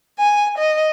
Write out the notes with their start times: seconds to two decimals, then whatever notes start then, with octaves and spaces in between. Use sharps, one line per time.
0.18 G#5
0.57 D#5